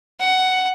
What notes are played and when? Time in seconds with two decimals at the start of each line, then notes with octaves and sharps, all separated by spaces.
0.20 F#5